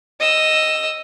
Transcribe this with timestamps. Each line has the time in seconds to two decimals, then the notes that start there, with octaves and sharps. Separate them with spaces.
0.20 D#5 E6